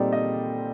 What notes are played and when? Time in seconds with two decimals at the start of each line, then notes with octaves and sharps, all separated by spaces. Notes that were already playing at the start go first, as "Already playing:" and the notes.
Already playing: A#2 G3 C4 D#4 A4 D5
0.12 D#5